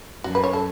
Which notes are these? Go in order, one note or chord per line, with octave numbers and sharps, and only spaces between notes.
F#2 F#4
B4
C#5
A4